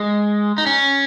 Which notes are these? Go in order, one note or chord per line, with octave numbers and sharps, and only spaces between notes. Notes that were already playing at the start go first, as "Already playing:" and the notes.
Already playing: G#3
D#4
C#4